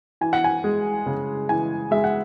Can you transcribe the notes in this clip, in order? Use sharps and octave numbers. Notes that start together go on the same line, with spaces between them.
E3 G#5
F#5
G#5
G#3
C#3
E3 G#5
G#3 E5
F#5